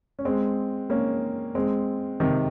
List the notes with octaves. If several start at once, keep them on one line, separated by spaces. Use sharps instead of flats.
C#4
G#3 C4
A#3 C#4
G#3 C4
C3 D#3